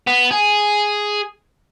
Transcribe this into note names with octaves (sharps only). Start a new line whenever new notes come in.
B3
G#4